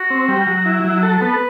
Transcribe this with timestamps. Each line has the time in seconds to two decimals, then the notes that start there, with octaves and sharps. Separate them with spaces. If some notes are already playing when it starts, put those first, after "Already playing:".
Already playing: F#4
0.10 C4
0.28 G3
0.47 F#3
0.66 E4
0.84 F#3
1.03 A4
1.21 B3 B4